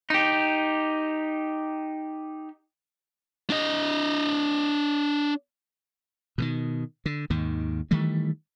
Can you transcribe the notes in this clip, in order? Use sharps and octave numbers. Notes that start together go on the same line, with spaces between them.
D#4 G4
D4 D#5
B2 D3 D#3
D3
D#2 G#2 D#3
D#3 E3 G3 A3